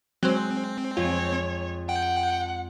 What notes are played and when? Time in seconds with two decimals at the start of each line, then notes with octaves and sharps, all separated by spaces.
0.23 F#3 G#3 C4 C5 F#6
0.97 F2 F4 G#4 C#5
1.89 F#5 G5